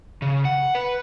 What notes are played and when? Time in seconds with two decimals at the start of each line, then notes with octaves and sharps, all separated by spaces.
0.22 C#3
0.45 F#5
0.75 B4